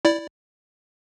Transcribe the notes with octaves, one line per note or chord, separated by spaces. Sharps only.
E4 D5